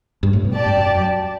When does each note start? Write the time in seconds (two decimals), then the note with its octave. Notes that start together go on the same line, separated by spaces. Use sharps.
0.23 G2
0.33 A2
0.44 B2
0.55 G4 D5 A5
0.66 G2
0.76 F#2
0.87 F#2